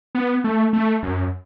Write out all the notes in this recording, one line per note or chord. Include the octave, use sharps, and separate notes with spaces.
B3
A3
A3
F#2